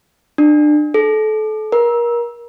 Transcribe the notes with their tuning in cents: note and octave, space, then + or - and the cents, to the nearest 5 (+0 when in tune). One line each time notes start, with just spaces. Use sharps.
D4 +30
A4 -30
A#4 +30